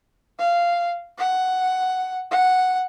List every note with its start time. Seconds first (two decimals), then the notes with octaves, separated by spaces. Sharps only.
0.39 F5
1.18 F#5
2.31 F#5